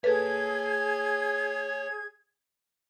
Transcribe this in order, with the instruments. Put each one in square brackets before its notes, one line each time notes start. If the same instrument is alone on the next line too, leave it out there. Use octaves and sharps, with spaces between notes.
[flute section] G#4 G#6 [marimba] A4 B4 [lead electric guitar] C#5 A5